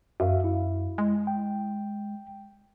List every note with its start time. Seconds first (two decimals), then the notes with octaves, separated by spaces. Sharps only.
0.20 F#2 F#4 E5 F5
0.44 E4
0.98 G#3
1.27 G5